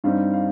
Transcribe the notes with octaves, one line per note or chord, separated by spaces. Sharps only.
G2 G3 C4 D#4 F5
F5